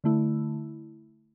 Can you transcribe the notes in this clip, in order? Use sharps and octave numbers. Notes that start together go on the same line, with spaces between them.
D3 A3 E4